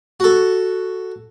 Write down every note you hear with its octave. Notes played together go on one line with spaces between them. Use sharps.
F#4 A4